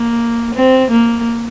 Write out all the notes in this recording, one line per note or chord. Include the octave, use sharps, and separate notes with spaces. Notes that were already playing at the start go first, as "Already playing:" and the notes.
Already playing: A#3
C4
A#3